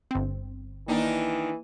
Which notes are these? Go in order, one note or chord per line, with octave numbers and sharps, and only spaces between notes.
G1 C4
D#3 E3 A#3 D4 D#4